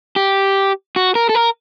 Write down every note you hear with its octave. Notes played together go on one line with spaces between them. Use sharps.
G4
F#4
A#4
A4
A#4